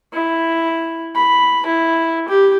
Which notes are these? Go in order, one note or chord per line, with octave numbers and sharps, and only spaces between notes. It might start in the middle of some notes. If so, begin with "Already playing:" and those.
E4
B5
E4
G4